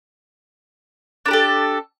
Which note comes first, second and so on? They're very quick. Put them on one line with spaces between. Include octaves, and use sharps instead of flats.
D4 A#4 G4 A4